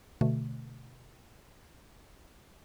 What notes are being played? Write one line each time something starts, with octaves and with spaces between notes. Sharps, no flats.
B2 D3 A3